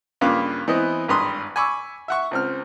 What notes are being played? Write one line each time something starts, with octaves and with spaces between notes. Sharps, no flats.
G2 C#3 A#3 F4 B4 D6
E3 B3 C4 D#5
G#1 G2 B4 A#5 C6 D#6
G#5 B5 C#6 D6 E6
E5 F#5 C#6
C#2 C4 F6